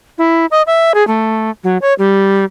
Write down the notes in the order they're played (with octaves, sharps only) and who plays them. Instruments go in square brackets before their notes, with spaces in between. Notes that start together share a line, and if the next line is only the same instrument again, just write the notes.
[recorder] E4
D#5
E5
G#4
A3
F#3
C#5
G3